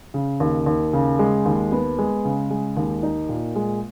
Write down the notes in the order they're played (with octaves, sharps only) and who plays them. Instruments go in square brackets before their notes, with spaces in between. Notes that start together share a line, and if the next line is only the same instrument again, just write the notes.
[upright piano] C#3
D#2
D#2
C#3
G#3
D#2
B3
G#3
C#3
G#3
D#2
D#4
A#2
G#3